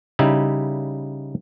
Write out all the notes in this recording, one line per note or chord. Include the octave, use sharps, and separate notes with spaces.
C#3 G3 D#4 E4